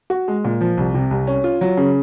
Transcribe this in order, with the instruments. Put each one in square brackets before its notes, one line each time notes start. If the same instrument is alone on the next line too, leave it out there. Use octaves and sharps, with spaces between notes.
[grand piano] F#4
G#3
A#2
F3
C2
C3
C2
C#4
F4
F#3
C#3